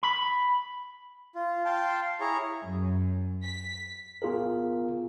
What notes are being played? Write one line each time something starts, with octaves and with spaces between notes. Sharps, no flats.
B5
F4
F5 G5 A5 C6
E4 G#4 C#5 A#5 C#6
F#2
B6
B3 F4 G#4 A#4